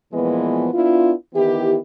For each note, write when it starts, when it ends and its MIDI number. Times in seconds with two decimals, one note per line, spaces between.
0.12 0.68 46
0.12 0.68 52
0.12 0.68 53
0.12 0.68 56
0.12 0.68 59
0.73 1.12 59
0.73 1.12 62
0.73 1.12 64
0.73 1.12 65
1.34 1.77 51
1.34 1.77 52
1.34 1.77 59
1.34 1.77 64
1.34 1.77 67